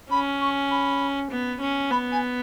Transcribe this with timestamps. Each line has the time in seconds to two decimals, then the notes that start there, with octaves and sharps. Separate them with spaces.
0.11 C#4 B5
0.40 C#6
0.70 B5
1.31 B3
1.61 C#4
1.91 B3 B5
2.11 G#5